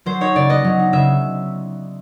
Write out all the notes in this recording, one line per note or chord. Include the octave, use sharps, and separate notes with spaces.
F#3 C5
D#4 C#5
C#3 D5
B3 D#5
F#3
D#4
C#3 E5